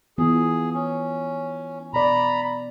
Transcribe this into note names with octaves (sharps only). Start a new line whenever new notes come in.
E3 B3 F4 G#4
C#4
B2 D5 A#5 B5